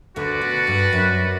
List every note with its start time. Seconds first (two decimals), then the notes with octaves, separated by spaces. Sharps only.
0.16 D2 D3 F#4 B4 D5
0.41 B2
0.67 G2
0.93 F#2